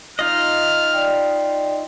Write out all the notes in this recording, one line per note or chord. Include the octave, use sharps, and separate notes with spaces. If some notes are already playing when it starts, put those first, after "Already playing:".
D#4 F4 D#5 F6
D5 G5